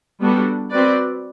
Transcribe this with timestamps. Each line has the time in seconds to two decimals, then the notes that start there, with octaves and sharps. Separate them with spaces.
0.21 G3 B3 D4 F#4 A4
0.70 C4 F#4 B4 D5